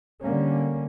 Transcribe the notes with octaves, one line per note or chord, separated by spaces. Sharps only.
D3 G3 A#3 C#4